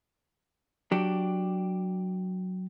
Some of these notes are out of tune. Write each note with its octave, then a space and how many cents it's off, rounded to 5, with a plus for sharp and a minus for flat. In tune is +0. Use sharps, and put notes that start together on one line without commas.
F#3 +0 D4 +10 G4 +0